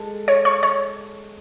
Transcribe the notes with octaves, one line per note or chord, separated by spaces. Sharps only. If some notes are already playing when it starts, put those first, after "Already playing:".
Already playing: G#3 A4
C#5
C#5
C#5